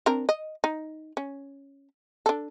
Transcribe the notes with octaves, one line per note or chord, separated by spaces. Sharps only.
C4 D4 A#4
D#5
D#4
C#4
D4 A4